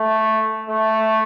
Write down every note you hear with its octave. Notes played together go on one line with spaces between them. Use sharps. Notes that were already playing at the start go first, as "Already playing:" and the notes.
Already playing: A3
A3